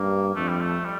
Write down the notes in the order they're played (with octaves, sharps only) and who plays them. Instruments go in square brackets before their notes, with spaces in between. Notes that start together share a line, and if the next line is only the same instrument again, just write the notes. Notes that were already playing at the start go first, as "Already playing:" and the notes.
Already playing: [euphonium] G2 [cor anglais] A#3
[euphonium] F2 [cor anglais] A3
[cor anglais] G3
A3
G3